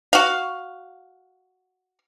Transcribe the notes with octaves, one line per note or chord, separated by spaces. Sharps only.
F#4 F5